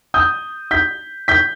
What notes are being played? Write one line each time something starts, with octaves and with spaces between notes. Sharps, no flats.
D#6 G6
G6 B6
G6 B6